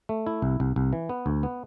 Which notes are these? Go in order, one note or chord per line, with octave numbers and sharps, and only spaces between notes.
A3
E4
C2
C2
C2
E3
B3
D2
B3